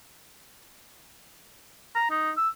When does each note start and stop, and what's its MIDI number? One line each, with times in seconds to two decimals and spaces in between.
1.95 2.07 82
2.11 2.31 63
2.37 2.49 88